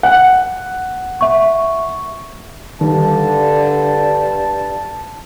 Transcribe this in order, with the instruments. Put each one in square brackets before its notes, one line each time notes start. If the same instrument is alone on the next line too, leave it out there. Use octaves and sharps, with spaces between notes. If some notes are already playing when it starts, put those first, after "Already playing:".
[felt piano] F#5
[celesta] E5 C#6
[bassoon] G2 [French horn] D3 [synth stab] D#3 G3 [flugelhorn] A5